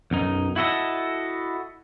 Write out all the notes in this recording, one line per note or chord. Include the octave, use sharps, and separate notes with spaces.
B1 F#2 D#4
E4 F#4 A4 D#5